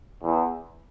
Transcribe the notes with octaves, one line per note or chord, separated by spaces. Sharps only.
E2